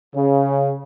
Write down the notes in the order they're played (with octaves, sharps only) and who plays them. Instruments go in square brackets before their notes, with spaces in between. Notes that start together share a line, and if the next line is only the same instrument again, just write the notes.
[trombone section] C#3